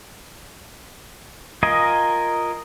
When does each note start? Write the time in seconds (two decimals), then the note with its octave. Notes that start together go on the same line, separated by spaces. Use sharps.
1.63 F4 A#4 D#5 G#5